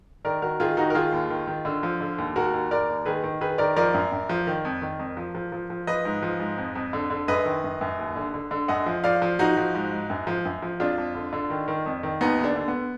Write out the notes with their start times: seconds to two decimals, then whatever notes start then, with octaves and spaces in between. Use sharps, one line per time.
0.25 D#3 A#4 D5
0.42 D#3 F#4 A#4
0.60 D#3 F4 G#4
0.77 D#3 D#4 F#4
0.90 A#4
0.95 D#3 F4 G#4
1.12 D#2
1.30 D#3
1.47 D#3
1.65 D3
1.83 F3
2.01 D3
2.18 D#2
2.36 D#2 F#4 A#4
2.54 D#2
2.71 D#2 A#4 D5
2.89 D#2
3.06 D#3 G#4 B4
3.24 D#3
3.41 D#3 G#4 B4
3.58 D#3 A#4 D5
3.76 F3 A#4 D5
3.94 F#2
4.12 F#2
4.29 F3
4.47 D#3
4.65 F2
4.82 D#3
4.99 F2
5.17 F3
5.35 F3
5.52 F3
5.70 F3
5.87 F3 B4 D#5
6.05 G#2
6.23 F3
6.40 G#2
6.58 F2
6.75 F2
6.93 D3
7.10 D3
7.28 F#2 B4 D#5
7.46 D#3
7.64 F#2
7.81 F#2
7.99 D#2
8.16 D3
8.34 D3
8.51 D3
8.68 F#2 D#5 F#5
8.86 F3
9.04 F3 D5 F5
9.22 F3
9.39 F3 D#4 F#4
9.57 F3
9.74 G#2
9.92 G#2
10.10 F#2
10.27 F3
10.45 F#2
10.62 F3
10.80 F2 D4 F4
10.98 F2
11.15 D3
11.33 D3
11.50 D#3
11.68 D#3
11.86 F2
12.03 D#3
12.21 D#2 B3 D#4
12.39 D#2
12.44 D4
12.56 D3
12.68 B3